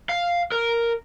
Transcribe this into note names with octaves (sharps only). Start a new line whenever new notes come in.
F5
A#4